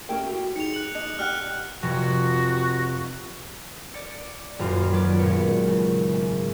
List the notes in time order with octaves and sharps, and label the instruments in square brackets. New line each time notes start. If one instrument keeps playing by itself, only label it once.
[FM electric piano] A3 G4 A#4 [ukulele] C#4 E4 G5
[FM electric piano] F#4 [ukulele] G4
[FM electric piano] D#4 G#4 [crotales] C#7 F7
[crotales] F#6 F#7
[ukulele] D4 D#5 [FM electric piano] A5
[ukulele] D4 G4 F#5 [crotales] F6 F#6
[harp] F1 [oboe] F#4
[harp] D5 C#7
D#1 F#2 F4
F#3 B4 D5
G#1 A#2 B3 C#7
C#3
G#2